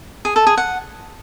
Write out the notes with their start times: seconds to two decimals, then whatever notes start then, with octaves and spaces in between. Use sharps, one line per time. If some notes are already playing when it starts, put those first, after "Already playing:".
0.25 G#4
0.36 A4
0.47 G#4
0.57 F#5